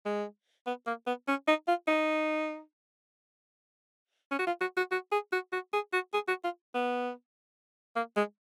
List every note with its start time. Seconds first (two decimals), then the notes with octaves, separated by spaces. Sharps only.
0.06 G#3
0.66 B3
0.87 A#3
1.07 B3
1.28 C#4
1.47 D#4
1.67 F4
1.87 D#4
4.31 C#4
4.39 F#4
4.47 F4
4.61 F#4
4.77 F#4
4.92 F#4
5.12 G#4
5.32 F#4
5.52 F#4
5.73 G#4
5.93 F#4
6.14 G#4
6.28 F#4
6.44 F4
6.74 B3
7.96 A#3
8.17 G#3